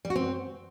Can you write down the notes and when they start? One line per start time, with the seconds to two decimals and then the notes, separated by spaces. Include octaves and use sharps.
0.05 G3
0.10 F#4
0.16 C4